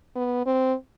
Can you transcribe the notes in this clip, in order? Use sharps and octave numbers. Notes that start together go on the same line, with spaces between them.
B3
C4